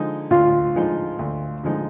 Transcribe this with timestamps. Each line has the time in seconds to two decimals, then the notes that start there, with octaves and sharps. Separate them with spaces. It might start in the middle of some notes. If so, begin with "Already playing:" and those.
Already playing: D3 F3 G#3 D#4
0.31 D2 F4
0.75 D3 F3 G#3 D#4
1.19 D2
1.63 D3 F3 G#3 D#4